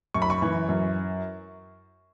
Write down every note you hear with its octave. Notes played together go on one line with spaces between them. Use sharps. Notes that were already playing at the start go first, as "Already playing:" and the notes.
F#2 C#6
B5
C#6
E3
F#2